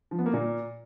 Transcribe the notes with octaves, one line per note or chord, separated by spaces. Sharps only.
F3
B3
A#3
A#2